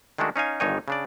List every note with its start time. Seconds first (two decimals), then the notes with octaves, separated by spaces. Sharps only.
0.18 D#3 G#3 A3 D4 F#4
0.36 C#4 D#4 F5 G#5
0.60 G1 G2 D#3 D#4 C#5 G#5
0.88 C#3 D4 D5